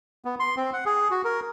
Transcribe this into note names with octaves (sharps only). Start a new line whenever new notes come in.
B3
C6
C4
F#5
G#4
F#4
A#4